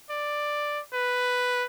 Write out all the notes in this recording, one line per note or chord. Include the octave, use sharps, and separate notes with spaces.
D5
B4